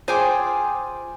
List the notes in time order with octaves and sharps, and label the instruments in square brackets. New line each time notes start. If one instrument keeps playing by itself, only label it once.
[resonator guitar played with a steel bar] F4 C5 G#5 [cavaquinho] G#4 G5 D6